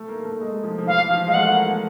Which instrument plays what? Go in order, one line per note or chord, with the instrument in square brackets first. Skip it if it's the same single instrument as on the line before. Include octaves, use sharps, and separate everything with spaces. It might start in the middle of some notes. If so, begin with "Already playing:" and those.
Already playing: [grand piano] A3
A#3
A#3
A3
G#3
F3
F3
[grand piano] E3 [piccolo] F5
[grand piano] F3
[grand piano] G#3 [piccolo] F5
[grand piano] A3 [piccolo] F#5
[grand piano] A#3
A#3